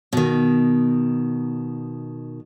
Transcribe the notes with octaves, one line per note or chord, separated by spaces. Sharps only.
B2 D#3